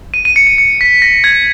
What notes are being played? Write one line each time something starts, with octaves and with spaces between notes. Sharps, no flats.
D#7
D#7
C#7
D#7
C#7
B6
A#6
G#6